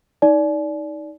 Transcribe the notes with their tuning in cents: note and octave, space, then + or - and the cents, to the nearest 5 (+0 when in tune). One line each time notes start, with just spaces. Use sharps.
D#4 +15 D5 -15 G#5 +45